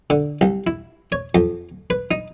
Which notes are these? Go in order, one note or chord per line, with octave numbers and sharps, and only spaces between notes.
D3
C2
E4
C#5
F2
B4
D#4